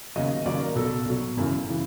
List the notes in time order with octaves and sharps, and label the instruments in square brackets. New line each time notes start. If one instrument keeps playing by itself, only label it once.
[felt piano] D#2 C#3 F#3 D#5
D#2 C#3 F#3 D5
A#4
B1 B2 F#3 A4
B1 B2 F#3
G#1 F#2 C#3 E3
C#3 E3